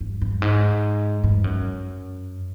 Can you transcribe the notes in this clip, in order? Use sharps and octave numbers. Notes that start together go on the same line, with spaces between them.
G2
G2
G#2
G2
F#2